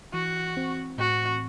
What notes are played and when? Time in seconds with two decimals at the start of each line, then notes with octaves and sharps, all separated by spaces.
0.13 E3 F#4
0.57 C4
0.98 A2 F#4